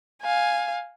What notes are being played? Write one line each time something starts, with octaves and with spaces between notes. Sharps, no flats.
F5 G#5